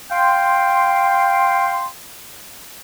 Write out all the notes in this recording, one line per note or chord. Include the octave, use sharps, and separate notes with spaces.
F5 G5 C6